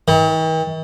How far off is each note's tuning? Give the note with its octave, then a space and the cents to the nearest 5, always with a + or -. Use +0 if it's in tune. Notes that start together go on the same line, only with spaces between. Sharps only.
D#3 +45